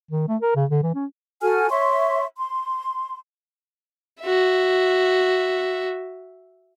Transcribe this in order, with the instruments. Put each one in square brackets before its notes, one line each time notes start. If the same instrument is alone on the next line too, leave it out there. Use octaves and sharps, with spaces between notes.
[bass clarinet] D#3
A3
A#4
C#3
D3
E3
C#4
[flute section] F#4 A4 G#5 F6
C#5 E5 C6 C#6
C6
[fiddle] F#4 E5